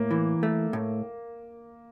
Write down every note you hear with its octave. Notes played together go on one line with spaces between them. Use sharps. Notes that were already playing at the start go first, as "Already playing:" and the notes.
Already playing: A2 A#3
E3
A3
A2